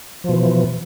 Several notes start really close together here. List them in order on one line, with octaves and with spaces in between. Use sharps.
F3 B2 E3